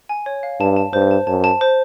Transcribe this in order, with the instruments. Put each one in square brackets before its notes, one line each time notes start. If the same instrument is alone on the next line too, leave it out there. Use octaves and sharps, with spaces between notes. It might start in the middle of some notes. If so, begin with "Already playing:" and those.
[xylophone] G#5
C#5
F5
[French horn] G2 [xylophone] A5
[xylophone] A5
[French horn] G2 [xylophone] C5
[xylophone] A5
[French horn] F#2 [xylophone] A5
[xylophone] A5
C5